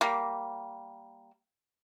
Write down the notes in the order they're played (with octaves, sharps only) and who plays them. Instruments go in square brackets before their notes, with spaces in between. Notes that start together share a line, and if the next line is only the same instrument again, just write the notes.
[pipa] G3 A#3